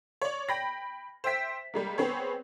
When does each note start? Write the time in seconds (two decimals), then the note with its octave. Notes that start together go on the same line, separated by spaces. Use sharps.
0.22 C#5 D5
0.49 G5 B5 A#6
1.24 C5 E5 G5 B6
1.74 G3 G#3 A#3
1.98 B3 C4 G#4 C#5